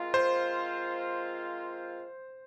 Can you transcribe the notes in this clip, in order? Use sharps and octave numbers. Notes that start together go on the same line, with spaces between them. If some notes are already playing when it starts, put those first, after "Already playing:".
Already playing: G#3 C4 F4 A#4 F5
C5